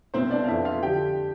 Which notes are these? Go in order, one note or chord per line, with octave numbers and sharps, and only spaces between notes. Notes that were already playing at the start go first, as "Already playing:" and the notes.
C2 B2 C4 C5
D4 D5
F5
F2 E3 E4 E5
F4 F5
D3 F3 G4 G5